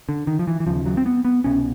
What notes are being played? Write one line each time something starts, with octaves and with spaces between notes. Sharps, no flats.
D3
D#3
F3
E3
E3
D#2 C#3 F3
F#3
C4
B3
B3
C2 B2 C#4